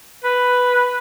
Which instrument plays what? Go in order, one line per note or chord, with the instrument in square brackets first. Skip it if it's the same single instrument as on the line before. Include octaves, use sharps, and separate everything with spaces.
[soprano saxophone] B4